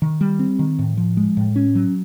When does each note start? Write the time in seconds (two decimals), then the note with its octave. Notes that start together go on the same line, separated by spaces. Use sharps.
0.02 D#3
0.21 G3
0.39 C4
0.59 D#3
0.79 A2
0.97 F3
1.17 G#3
1.37 A2
1.56 C#4
1.75 F#3